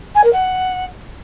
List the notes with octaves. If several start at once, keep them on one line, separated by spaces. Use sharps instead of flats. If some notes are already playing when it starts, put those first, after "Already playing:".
G#5
A#4
F#5